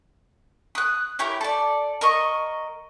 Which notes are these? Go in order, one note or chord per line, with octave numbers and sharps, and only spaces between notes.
D#6 F#6
C#4 E4 G4 A#4
A4 D5
A#4 D#5 C#6